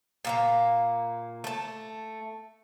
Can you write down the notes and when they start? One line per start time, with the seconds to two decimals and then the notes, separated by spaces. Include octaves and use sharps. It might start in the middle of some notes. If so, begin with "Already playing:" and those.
0.25 A#2 A#3 A#5
1.44 A3 A5